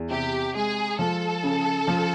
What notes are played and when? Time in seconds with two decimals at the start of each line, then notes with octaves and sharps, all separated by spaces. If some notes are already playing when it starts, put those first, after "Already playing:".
Already playing: E2
0.10 C3 G4
0.54 G#3 G#4
0.99 F3 A4
1.43 C#3
1.87 F3